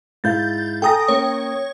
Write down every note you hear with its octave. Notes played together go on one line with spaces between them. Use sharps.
G#2 E4 F5 G6 A6
A4 G5 G#5 A#5 D#6 A#6
A#3 C#4 C#5